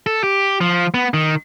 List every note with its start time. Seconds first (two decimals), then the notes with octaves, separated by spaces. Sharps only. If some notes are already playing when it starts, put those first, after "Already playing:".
0.06 A4
0.24 G4
0.61 F3
0.94 B3
1.14 D#3